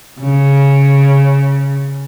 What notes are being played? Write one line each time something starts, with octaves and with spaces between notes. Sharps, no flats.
C#3